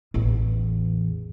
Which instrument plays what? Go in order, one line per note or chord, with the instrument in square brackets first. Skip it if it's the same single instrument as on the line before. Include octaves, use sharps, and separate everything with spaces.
[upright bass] A1 E2